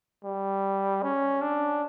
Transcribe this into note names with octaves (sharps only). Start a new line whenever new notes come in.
G3
C#4
D4